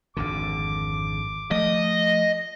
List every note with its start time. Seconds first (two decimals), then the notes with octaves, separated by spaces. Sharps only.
0.17 G#1 F2 D3 D6
1.51 F3 A3 D#5